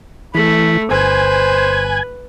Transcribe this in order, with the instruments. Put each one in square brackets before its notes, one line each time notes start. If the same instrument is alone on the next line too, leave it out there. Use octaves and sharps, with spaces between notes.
[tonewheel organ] E3 [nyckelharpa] A3 [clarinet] B5
[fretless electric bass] G1 [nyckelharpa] B4 [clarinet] C5 [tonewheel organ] G#5